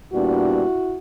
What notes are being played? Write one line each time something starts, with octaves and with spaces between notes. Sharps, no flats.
A#2 G3 B3 D4 E4 F#4